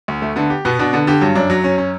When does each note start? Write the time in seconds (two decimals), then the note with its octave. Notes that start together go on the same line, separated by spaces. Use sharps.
0.08 D2
0.22 A3
0.36 D3 B3
0.50 G4
0.65 B2 B3
0.79 B2 D4
0.93 D3 B3
1.07 D3 G4
1.21 G2 F#3
1.35 F#2 D4
1.50 F#3
1.64 C#4
1.78 C#4